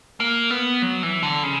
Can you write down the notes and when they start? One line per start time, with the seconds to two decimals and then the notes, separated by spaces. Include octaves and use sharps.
0.20 A#3
0.51 B3
0.82 F#3
1.03 E3
1.23 D3
1.43 C#3